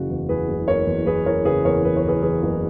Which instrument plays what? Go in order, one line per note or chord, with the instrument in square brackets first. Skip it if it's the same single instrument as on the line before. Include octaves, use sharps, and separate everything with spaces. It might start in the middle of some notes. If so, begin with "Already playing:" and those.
Already playing: [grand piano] F#1 C#3 E3 F#4
E2
E2 G#4 B4
F#1
F#1 A#4 C#5
E2
E2 G#4 B4
E3 A#4 C#5
C#3 G#4 B4
E2 A#4 C#5
E3 B4
C#5
F#1 G#4 B4
E3 G#4 B4
F#1